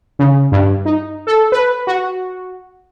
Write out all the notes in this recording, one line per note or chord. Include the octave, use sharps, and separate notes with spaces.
C#3
G2
D#4
A4
B4
F#4